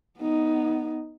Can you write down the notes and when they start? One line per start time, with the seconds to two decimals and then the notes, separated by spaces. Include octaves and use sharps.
0.19 B3 D#4